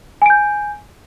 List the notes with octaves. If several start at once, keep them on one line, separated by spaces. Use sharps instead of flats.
G#5 G6 D7